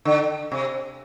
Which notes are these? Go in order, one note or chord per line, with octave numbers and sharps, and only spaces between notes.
D3
C3